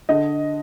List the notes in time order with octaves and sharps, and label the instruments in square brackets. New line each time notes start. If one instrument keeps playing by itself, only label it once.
[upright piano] D3 D#5